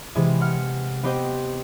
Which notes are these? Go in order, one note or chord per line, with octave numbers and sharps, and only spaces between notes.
C3 E3 G#3 E4 G#4
F#5 F6
B3 C4 G4 C5 D#5 G5